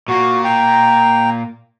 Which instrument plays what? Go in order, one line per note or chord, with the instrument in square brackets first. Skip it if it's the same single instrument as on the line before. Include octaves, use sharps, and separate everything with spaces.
[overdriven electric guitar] A#2 A#3 [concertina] F#4
[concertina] G5 A#5